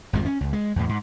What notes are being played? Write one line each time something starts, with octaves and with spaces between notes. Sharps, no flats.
G#1 F2 F3 G#3
C#4
C#2
G#3
E2 A2
G#2